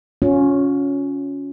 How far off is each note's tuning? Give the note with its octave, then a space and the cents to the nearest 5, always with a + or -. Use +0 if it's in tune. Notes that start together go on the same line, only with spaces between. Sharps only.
C#4 +10 F4 +45